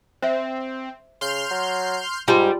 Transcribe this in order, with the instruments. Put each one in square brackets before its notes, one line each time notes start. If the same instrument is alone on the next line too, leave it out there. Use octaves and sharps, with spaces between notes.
[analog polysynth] C4 [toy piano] C5 E5
[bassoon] C#3 [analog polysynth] C6 F6 G6
[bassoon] F#3
[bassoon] G#2 [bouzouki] G3 [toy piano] F4 A5 C6